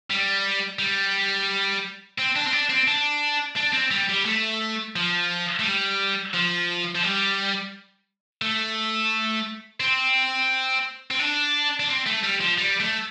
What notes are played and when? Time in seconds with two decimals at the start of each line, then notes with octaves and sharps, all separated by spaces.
0.10 G3
0.79 G3
2.18 C4
2.36 D4
2.47 C4
2.52 D4
2.69 C4
2.87 D4
3.56 D4
3.73 C4
3.91 G3
4.09 G3
4.25 A3
4.96 F3
5.59 A3
5.64 G3
6.34 F3
6.95 F3
7.03 G3
8.42 A3
9.80 C4
11.11 C4
11.19 D4
11.80 D4
11.89 C4
12.06 A3
12.23 G3
12.41 F3
12.58 G3
12.80 A3